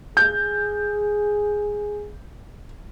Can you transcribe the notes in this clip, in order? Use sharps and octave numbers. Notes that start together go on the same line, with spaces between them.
G#4 G6